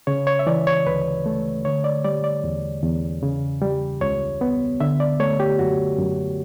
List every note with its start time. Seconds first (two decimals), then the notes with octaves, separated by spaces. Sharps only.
0.07 C#3 C#5
0.27 C#5
0.39 E5
0.47 E3 D5
0.67 C#5
0.86 D2 B4
1.26 A3
1.65 D3 C#5
1.84 D5
2.04 G3 D5
2.24 D5
2.44 E2
2.83 E2
3.23 C#3
3.62 G3
4.01 C#2 C#5
4.41 B3
4.80 D3 E5
5.00 D5
5.20 A3 C#5
5.40 G4
5.59 F#2 F#4
5.99 F#2